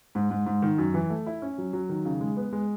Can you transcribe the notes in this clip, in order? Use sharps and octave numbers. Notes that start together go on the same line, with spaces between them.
G#2
G#2
G#2
D#3
F#2
E3
A3
E4
C#4
F#3
F#3
D#3
C#3
G#3
B3
G#3